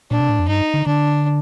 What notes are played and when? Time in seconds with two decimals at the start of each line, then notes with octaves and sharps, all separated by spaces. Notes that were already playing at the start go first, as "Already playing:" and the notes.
0.11 A#2 D4
0.20 C3
0.29 A2
0.39 F2
0.48 G2 D#4
0.74 D3
0.86 D3 D4